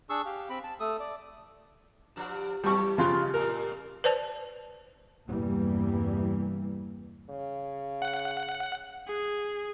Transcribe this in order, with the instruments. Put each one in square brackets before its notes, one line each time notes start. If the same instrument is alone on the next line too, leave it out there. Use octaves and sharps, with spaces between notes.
[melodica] D4 G#4 C#6 E6
G4 F5
C4 B5
A5
A3 A4 D#6
D5
[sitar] G2 F3
[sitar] E3 A3 G4 [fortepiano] G3 C#6
[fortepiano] C#3 F3 C6 [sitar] G#3 F4 G4
[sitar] A2 G3 [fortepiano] A#4
[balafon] B4 C5 D5 A5
[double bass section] E2 G2 C3 E3 G3 A#3
[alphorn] C#3
[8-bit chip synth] F#5
[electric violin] G#4